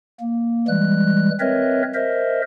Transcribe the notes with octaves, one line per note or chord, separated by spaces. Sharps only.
A#3
E3 G3 G#3 F#6
C4 A#4 B4 C#5 D#5 E5
A#4 C5 D#5 E5